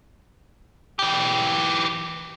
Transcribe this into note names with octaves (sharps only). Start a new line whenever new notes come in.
E3 G4